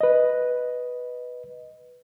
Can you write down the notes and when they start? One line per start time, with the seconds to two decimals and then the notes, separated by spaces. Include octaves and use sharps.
0.01 B4 D#5